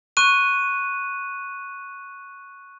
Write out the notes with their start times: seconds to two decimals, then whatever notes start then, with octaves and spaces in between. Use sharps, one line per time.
0.17 C#6 F#6 D#7